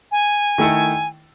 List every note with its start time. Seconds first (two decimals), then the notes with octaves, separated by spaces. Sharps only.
0.12 G#5
0.58 D#3 A3 E4 A4